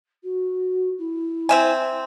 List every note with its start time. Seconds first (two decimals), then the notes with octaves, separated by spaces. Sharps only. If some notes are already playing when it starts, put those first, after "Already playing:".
0.23 F#4
0.98 E4
1.49 C4 E5 G#5